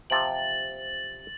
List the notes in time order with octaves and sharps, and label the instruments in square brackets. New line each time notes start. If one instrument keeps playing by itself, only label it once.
[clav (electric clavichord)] C3 F3 G5 [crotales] A6 F#7